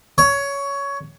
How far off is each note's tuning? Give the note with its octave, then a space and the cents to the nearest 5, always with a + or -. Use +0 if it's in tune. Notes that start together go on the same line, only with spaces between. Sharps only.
C#5 +15